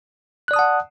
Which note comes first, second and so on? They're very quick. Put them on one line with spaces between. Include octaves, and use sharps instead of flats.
F#6 D5 D#6 A5 F#5